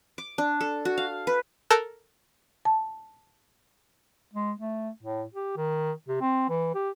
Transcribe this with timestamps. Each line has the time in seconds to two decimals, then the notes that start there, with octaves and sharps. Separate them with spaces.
0.18 D6
0.38 D4
0.61 A4
0.85 F#4
0.98 F5
1.27 B4
1.70 A4 A#4 A5 E6 F#6 G6
2.65 A5
4.33 G#3
4.59 A3
5.03 A2
5.34 G4
5.57 D#3
6.08 C3
6.21 C4
6.49 E3
6.75 G4